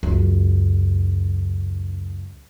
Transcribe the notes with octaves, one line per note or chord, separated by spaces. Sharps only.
C#2 F#2